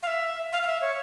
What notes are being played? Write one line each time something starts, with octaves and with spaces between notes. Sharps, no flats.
F5
E5
F5
F5
E5
C#5